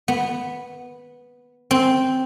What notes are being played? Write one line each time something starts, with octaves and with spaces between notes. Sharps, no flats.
B3
C4